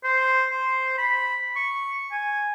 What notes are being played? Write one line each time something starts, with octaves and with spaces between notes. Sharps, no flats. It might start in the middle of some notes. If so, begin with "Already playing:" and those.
C5
C5
B5
C#6
G#5